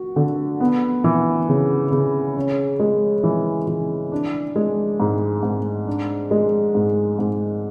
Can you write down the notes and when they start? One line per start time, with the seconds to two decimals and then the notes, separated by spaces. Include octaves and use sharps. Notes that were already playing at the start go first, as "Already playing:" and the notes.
Already playing: F#4
0.16 D3
0.60 B3
1.04 E3
1.49 C#3
1.92 C#3
2.36 C#4
2.80 G#3
3.23 E3
3.67 E3
4.12 D4
4.56 G#3
5.00 G#2
5.43 G#2
5.87 D4
6.31 G#3
6.75 G#2
7.19 G#2